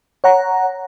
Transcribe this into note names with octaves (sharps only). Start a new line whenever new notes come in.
C#5 F#5 A#5